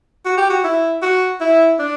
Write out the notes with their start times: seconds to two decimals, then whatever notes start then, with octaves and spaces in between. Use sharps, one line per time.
0.25 F#4
0.37 G4
0.50 F#4
0.64 E4
1.02 F#4
1.41 E4
1.79 D4